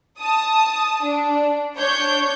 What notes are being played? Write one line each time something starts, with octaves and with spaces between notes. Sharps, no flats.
A5 D#6
D4
D4 C#5 G6